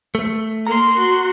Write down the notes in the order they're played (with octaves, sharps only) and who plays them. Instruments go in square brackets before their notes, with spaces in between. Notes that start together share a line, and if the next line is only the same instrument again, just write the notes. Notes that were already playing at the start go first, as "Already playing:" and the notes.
[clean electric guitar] A3
[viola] A#3 C6 [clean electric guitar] A#5
[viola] F#4 C6